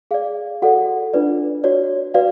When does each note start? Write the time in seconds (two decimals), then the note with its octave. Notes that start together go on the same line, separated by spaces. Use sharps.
0.11 G#4 D5 F5
0.62 F#4 A4 D5 F#5
1.14 D4 F4 B4 D5
1.64 F#4 C#5 D5
2.14 F#4 B4 D5 F5